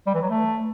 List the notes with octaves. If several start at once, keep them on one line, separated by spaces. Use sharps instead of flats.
G3
E3
F#3
A3